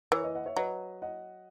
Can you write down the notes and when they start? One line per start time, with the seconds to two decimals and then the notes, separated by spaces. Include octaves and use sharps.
0.12 E3 A#4 C#5
0.24 B4 D#5
0.35 D#5 F#5
0.45 C#5 E5
0.56 F#3 B4 D#5
1.02 D#5 F#5